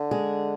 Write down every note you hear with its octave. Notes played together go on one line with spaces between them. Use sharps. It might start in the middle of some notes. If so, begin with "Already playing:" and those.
Already playing: D3
G#3 G#4